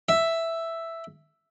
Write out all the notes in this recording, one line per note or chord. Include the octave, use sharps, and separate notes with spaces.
E5